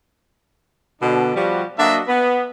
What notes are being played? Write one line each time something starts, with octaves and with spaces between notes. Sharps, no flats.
B2 D3 D4
F3 G3 F#4
F#3 A#3 D4 F#4 D#5 E5
B3